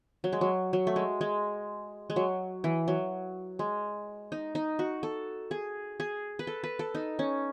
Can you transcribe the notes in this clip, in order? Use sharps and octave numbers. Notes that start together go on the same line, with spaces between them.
F#3
G#3
F#3
F#3
A3
G#3
G#3
G#3
F#3
E3
F#3
G#3
D#4
D#4
F#4
A4
G#4
G#4
B4
A4
B4
A4
D#4
C#4